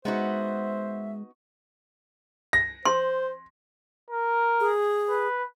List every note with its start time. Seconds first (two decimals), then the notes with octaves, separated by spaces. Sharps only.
0.05 G#3 B3 D#4 F#4 C5 E5
2.53 A#6
2.85 C5 C6
4.10 A#4
4.60 G#4
5.10 B4